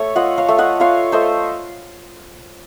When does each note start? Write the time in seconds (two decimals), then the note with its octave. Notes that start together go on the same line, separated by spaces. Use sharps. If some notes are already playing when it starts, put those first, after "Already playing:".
Already playing: A3 C#5
0.16 F4 D#5 F#5
0.38 C#5 F5
0.48 A3
0.58 D#5 F#5
0.80 F4 C#5 F5
1.12 A3 C5 D#5